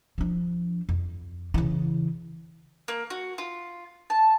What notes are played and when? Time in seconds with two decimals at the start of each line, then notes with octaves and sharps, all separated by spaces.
0.18 F3 D4
0.89 F2
1.54 C#3 E3
2.88 A#3
3.10 F#4
3.38 F4
4.10 A5